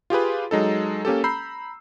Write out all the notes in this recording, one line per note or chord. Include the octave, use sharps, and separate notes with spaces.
F4 G4 G#4 B4
F#3 G#3 D#4 A4
A#3 C#4 G4 A4
A#5 B5 E6 G6 C7